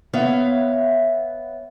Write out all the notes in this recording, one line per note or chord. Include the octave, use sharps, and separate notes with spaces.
B3 C#5 E5 F5